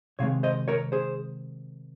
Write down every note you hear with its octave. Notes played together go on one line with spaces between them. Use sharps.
C3 D#3 G#3 C#5 F5
C5 D#5
A#4 C#5
G#4 C5